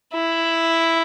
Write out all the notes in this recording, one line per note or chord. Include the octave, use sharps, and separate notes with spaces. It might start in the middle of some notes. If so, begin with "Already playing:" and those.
E4